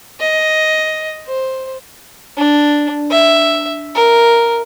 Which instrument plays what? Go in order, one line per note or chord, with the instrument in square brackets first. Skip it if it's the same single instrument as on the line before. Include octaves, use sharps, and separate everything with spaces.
[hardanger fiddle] D#5
C5
D4
E5
A#4